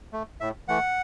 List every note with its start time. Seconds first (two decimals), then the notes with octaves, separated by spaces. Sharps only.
0.13 A3
0.41 A2 E5
0.68 E3 A3 F#5